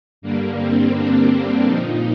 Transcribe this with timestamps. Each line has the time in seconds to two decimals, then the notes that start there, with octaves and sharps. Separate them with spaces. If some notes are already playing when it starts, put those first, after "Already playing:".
0.22 G2 D3 G3 A#3
0.58 C4
0.94 D4
1.65 A#2 F3 D#4